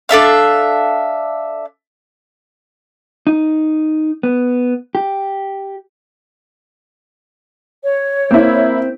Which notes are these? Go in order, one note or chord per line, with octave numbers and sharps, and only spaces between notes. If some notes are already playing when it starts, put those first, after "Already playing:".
D4 A4 E5 F5
D#4
B3
G4
C#5
A#3 C4 E4